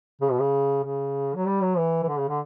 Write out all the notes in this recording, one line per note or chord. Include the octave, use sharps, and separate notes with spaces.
C#3
B2
C#3
C#3
F#3
G3
F#3
E3
E3
D3
C#3
D3